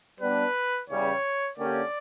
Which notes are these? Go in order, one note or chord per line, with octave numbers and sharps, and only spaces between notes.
G3 B3 D4 B4
E2 C#3 G3 C#5
D3 A#3 C#4 G4 D5